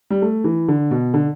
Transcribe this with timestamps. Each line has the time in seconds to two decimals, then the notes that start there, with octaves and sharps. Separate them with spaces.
0.10 G3
0.22 A3
0.44 E3
0.68 D3
0.91 B2
1.14 D3